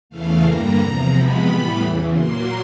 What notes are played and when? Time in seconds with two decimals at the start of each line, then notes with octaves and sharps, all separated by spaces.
0.10 E2 C#3 E3 A3 F5
0.43 G2 D3 G3 A#3 A#5
0.78 E2 C3 F3
1.11 C3 F3 G#3 B3 B5
1.45 A2 E3 G3 B3
1.80 E2 C#3 E3
2.13 A#2 F#3 A#3 C6